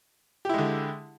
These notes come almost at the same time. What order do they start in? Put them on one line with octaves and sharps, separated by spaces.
G4 E4 G#3 D3